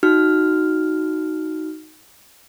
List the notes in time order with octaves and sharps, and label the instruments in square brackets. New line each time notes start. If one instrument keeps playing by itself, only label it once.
[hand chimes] D#4 F#4 F6